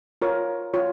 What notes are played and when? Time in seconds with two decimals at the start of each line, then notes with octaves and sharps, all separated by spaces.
0.22 F4 A#4 C#5
0.74 F4 C#5